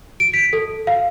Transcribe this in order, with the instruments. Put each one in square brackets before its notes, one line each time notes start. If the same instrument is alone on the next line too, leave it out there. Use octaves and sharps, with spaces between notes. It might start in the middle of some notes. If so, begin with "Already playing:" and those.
[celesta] D7
B6
A4
F5